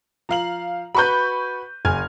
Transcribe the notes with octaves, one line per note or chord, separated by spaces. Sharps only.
F3 F5 A#5 F#7
F#4 B4 B5 C#6 G6
F#1 G#5 F6 G#6